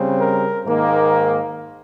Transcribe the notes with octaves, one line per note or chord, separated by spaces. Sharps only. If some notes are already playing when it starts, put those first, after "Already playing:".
Already playing: C#3 G3 C4
A#4
G#2 D#3 A#3